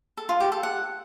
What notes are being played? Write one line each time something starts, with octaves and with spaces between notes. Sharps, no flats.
A4
F4
G4
A4
F#5